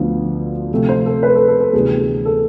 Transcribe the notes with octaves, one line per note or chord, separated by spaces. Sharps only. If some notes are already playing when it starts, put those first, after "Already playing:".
Already playing: D2 D3 F3 B3 D4
C3 F3 A3 C4
C5
A4
B4
A4
A4
A4
D2 C3 E3 B3 D4 G#4
A4